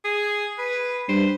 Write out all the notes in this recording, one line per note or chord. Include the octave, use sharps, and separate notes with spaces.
G#4
B4
G2 C5